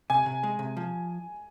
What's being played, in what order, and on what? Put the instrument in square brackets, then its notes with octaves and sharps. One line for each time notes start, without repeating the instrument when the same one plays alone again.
[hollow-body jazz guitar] C3 [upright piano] G#5
[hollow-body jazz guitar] C3
G#3
C3
F3